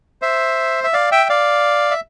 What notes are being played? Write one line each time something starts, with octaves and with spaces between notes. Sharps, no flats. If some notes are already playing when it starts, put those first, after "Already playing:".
C5 E5
E5
D5 F5
E5 G5
D5 F5
E5